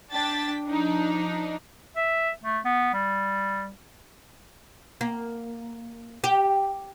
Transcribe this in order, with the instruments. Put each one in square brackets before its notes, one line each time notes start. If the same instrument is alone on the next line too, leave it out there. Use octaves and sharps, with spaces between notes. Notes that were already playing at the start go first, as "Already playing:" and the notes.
[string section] D4 G5 A5 A6 B6
F3 D4 D#4
[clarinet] E5
A3
B3
G3
[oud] A#3
G4